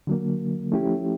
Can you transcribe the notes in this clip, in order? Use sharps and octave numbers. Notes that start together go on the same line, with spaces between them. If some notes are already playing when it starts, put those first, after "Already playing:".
D3 F#3 A#3
F3 A3 C#4 E4 G4